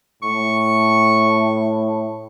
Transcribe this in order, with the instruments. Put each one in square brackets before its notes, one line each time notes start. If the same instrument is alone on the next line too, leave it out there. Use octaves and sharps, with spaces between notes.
[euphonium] A2 [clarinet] C#6